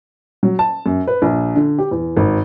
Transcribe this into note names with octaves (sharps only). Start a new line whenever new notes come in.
F#3
A5
F#2
B4
A#1
D3
G4
E2
G#1